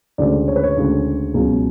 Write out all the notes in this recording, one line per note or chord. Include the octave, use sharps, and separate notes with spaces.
D2 C#3 G#3 D5
C#5
B4
C#5
D2 C#3 G#3
C#2 B2 F#3